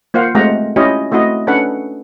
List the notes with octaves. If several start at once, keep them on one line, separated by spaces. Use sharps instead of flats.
A#3 F4 C5 F5 F#5
G#3 A3 C4 G4 F#5 A#5
C#4 E4 F4 G4 C#5 D#5
A3 C4 E4 F#4 D#5
C#4 D4 A4 B4 F#5